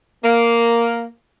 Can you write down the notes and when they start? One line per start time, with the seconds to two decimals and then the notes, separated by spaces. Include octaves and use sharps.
0.24 A#3